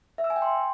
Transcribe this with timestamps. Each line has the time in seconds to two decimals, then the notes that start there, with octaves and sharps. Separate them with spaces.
0.18 E5
0.24 E6
0.30 G#5
0.36 G5
0.42 C6